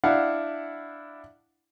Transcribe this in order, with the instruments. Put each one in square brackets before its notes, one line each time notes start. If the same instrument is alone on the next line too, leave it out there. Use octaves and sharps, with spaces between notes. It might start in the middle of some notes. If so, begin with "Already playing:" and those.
[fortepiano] D4 E4 F5 F#5